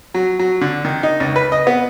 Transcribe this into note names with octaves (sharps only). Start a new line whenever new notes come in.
F#3
F#3
D3
D#3
D#4
C#2
B4
D#5
B3